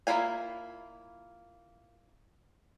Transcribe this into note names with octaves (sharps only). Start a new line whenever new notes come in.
A#3 E4 F4 F5 G#5